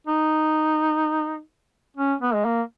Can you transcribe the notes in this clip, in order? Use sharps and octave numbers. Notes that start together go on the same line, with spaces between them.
D#4
C#4
B3
G#3
A#3